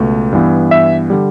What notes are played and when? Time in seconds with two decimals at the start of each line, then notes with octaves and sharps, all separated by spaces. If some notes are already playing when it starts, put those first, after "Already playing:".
Already playing: C#2 B2 A3
0.33 G2 E3 B3
0.71 E5
1.10 D3 G3